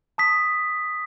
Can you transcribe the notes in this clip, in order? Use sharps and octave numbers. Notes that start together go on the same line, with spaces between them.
A5 D#6 B6